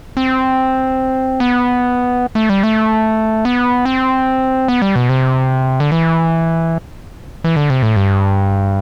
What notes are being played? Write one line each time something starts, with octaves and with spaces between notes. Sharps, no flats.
C4
B3
A3
G3
A3
B3
C4
B3
G3
B2
C3
D3
E3
E3
D3
C3
A2
G2